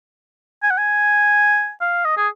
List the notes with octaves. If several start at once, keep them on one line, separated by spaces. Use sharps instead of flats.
G#5
F#5
G#5
F5
D#5
G#4